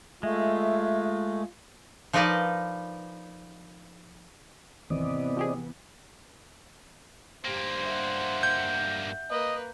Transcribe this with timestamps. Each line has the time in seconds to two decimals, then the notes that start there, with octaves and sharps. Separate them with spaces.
0.23 G#3 A3 F4 E5
2.13 F3 D#4 A#4 B4 D5 D#5
4.90 G#1 E2 C3 E3 B3 C4 D5 D#5
5.37 F3 G4 G#4
7.45 G2 A#3 G4 C5
7.85 E5 F#5
8.43 G6
9.30 A#3 B4 D#5